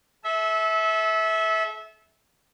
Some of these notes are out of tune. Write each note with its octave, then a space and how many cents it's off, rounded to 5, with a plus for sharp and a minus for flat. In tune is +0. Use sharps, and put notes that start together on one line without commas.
A4 -35 E5 -20